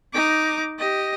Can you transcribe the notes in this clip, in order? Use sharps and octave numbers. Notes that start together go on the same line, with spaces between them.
D#4 D6
G4 D#5